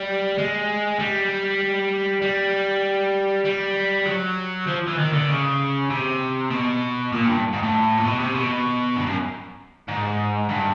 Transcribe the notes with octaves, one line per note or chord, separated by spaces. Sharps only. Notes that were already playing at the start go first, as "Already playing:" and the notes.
Already playing: G3
G#3
G3
G3
G3
F#3
F3
E3
D#3
D3
C#3
C3
B2
A#2
G2
G#2
A2
A#2
B2
C3
B2
G2
F#2
G#2
G2